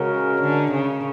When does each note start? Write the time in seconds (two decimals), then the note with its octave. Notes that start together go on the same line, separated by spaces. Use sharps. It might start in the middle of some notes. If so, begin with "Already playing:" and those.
Already playing: C#3 G#3 C#4 F#4 A#4
0.41 D3
0.71 C#3